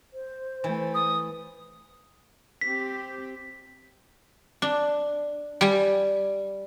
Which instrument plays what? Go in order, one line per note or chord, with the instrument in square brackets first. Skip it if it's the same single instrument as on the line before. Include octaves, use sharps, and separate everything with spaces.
[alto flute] C5
[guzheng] E3 [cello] A3
[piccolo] D#6
[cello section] C4 G4 [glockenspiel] B6
[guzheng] D4
G3 G#5